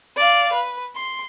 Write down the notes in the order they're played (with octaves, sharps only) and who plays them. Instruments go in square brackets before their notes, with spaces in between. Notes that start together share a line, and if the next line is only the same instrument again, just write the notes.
[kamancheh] D5 F5
B4
C6